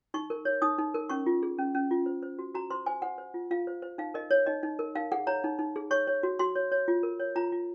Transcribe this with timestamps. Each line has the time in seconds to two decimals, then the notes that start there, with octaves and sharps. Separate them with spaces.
0.14 D#4 C#6
0.30 A#4
0.45 C#5
0.62 D#4 D#6
0.78 D#4
0.94 A#4
1.09 C#4 C#6
1.26 F4
1.43 G#4
1.59 C#4
1.75 C#4
1.91 F4
2.06 C5
2.23 C5
2.39 F#4
2.55 F#4 A#5
2.71 C5 C6
2.86 C5 G#5
3.02 C5 F#5
3.18 C5
3.34 F4
3.51 F4 F5
3.67 C5
3.82 C5
3.98 D#4 F5
4.14 A#4 D#5
4.31 C#5
4.46 D#4 D#5
4.63 D#4
4.79 A#4
4.95 D#4 F5
5.12 G#4 F#5
5.27 C#5 A#5
5.44 D#4
5.59 D#4
5.76 G#4
5.91 C#5 C#6
6.07 C#5
6.23 F#4
6.39 F#4 C6
6.56 C#5
6.72 C#5
6.88 F4
7.03 A#4
7.20 C#5
7.36 F4 A#5
7.52 F4